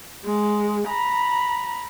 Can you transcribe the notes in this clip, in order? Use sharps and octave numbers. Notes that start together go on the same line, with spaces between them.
G#3
A#5 B5